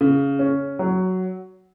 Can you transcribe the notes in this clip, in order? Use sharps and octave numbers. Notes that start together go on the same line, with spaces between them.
C#3
C#4
F#3